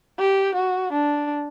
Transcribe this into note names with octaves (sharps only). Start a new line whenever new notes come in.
G4
F#4
D4